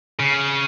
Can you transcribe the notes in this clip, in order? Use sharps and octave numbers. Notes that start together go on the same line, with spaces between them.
C#3